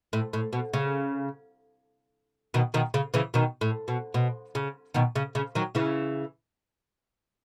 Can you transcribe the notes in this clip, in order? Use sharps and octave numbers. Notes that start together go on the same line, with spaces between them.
A2
A2
B2
C#3
B2 D#3
B2 D#3
C#3
C#3 E3
B2 D#3
A2
B2
B2
C#3
B2 D#3
C#3
C#3
D#3 F#3
C#3 E3